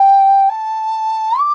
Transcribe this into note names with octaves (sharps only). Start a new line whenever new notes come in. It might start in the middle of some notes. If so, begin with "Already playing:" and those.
Already playing: G5
A5
D6